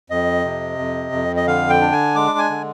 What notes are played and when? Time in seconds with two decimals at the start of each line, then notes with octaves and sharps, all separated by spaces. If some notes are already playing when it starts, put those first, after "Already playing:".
0.10 F2 D#5
0.45 C3
0.79 F2
1.12 F2
1.36 D#5
1.47 D3 F5
1.70 G5
1.81 D4
1.92 G#5
2.15 G#3 D6
2.38 G#5
2.50 D3